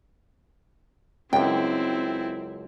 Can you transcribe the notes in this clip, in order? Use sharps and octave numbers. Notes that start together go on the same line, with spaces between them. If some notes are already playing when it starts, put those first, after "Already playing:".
C#2 F#2 C4 E4 G5